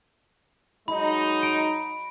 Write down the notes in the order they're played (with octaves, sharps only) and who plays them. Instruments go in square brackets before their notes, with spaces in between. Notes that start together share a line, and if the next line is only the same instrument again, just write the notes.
[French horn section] F#3 G#3 D#4 [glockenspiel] B5
[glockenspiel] D7